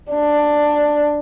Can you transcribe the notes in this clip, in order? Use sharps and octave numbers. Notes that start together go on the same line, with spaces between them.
D4